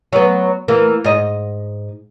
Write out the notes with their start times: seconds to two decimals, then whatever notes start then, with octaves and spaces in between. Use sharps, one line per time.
0.13 F#3 B3
0.68 E3 A#3
1.04 G#2 D#5